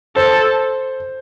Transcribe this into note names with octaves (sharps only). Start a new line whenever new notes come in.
A4 C5